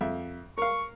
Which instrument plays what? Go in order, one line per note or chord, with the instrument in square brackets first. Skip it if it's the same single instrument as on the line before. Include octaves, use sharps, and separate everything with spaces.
[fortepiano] F2 E5
[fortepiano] A#4 F5 [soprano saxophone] C#6